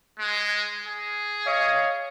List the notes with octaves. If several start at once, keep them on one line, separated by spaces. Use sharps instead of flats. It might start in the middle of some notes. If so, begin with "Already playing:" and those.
G#3
G#4
C#5 D#5 F5